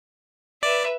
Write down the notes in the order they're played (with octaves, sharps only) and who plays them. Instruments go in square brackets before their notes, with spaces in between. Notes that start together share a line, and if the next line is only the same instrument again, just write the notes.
[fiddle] B4 E5 [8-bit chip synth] D5